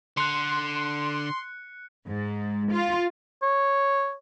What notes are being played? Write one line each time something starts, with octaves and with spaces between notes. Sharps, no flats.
D3 C6 F#6 C#7
G#2
F4
C#5